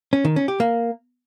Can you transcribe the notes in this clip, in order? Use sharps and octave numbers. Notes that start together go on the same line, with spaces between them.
C#4
D#3
C#4
G4
A#3